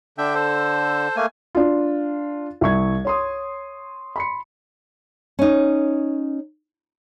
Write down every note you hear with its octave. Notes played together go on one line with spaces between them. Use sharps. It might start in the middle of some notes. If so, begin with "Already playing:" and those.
D3 D4 E5 G5
A4 C5
A3 A#3 G#5
D4 F4
C2 E5 C#6 G#6
C#5 C6 D#6
B5 C6 C#7
C#4 D#4